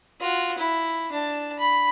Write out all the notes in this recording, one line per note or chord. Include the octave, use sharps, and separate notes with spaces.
F4 F#4
E4
D4 A5
B5